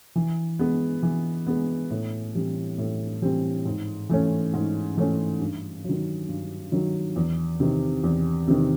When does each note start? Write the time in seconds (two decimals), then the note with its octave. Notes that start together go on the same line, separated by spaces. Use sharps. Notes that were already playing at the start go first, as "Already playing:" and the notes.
0.15 E3
0.59 G#3 B3
1.03 E3
1.47 G#3 B3
1.91 A2
2.35 E3 G3 C4
2.78 A2
3.22 E3 G3 C4
3.65 G#2
4.09 E3 A3 C#4
4.53 G#2
4.97 E3 A3 C#4
5.41 G2
5.84 D#3 F#3
6.29 G2
6.72 D#3 F#3
7.16 E2
7.60 C3 D#3
8.04 E2
8.47 C3 D#3